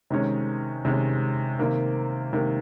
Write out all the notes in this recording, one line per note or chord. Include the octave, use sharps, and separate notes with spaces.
C3 D#3 G#3 C#4
C3 D#3 G#3 C#4
C3 D#3 A#3
C3 D#3 A#3